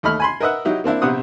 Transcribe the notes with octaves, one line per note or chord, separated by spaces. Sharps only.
D#2 A3 D#5 B5 F6
G#5 B5 C6
A#4 B4 D#5 E5 F#5
F#3 D#4 E4 G4
A#3 C4 D4 E4
A#1 C3 B3 G4 F#5 D#6